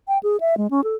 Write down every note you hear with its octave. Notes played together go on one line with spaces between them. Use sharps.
G5
G#4
E5
G#3
C#4
A4